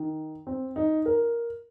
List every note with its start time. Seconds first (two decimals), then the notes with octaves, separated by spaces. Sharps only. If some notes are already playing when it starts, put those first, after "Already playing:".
Already playing: D#3
0.47 C4
0.76 D#4
1.05 A#4